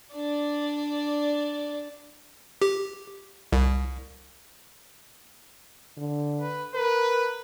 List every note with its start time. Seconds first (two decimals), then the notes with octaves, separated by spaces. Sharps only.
0.13 D4 D5
2.62 G4
3.53 C2
5.97 D3
6.41 B4
6.75 A#4 B4